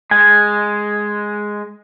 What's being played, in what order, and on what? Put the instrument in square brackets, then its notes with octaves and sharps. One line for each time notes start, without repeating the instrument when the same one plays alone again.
[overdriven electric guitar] G#3 [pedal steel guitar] G#5